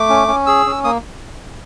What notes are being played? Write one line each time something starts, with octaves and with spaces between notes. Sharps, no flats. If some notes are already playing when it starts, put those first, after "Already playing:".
Already playing: A3 D6
C#4
C#4
G#4 E6
C#4
A#3 D#6